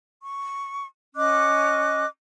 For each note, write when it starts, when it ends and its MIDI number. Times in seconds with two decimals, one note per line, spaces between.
0.23 0.88 85
1.15 2.05 61
1.15 2.05 75
1.15 2.05 86
1.15 2.05 90